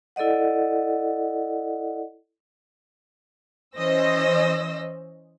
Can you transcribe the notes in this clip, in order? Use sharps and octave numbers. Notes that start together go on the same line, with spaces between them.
E4 A4 D5 D#5 F#5
E3 C#4 C5 D#5 E6 A#6